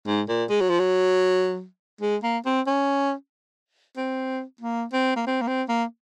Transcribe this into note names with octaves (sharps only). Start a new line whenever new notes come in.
G#2
A#2
G#3
F#3
F3
F#3
G#3
A#3
C4
C#4
C4
A#3
C4
A#3
C4
A#3
C4
A#3